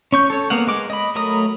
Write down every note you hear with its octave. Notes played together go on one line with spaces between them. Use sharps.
C#4 C#6 G6
A4 C#5
A#3 B3 F5 F#5
G#3 D6
D#5 B5
F#3 A3 A#4 D#6